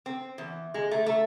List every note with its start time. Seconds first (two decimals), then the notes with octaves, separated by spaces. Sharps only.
0.06 C4
0.38 E2
0.74 G#3
0.91 A3
1.06 A3